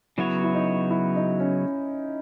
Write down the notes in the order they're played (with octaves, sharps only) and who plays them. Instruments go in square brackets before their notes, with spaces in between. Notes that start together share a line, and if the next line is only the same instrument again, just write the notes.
[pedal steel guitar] C#3 F#3 B3 F#4 C#5 [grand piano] E4
[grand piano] E4
D#4
E4
D#4
C#4